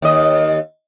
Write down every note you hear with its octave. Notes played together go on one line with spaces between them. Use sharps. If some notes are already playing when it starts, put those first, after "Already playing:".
D#2 D#5